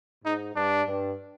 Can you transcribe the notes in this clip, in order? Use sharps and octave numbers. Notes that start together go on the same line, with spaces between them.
G#2 D#4
G2 D4
G2